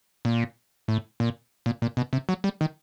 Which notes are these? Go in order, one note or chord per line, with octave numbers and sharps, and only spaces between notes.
A#2
A2
A#2
A#2
A#2
B2
C3
F#3
G3
D#3